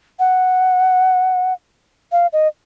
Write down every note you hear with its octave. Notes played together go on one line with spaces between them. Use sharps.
F#5
F5
D#5